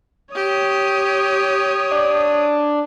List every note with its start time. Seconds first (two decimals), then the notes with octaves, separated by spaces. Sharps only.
0.35 G4 C#5 D#6
1.91 D4